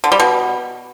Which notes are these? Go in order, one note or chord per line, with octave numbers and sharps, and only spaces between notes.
D3
G3
B2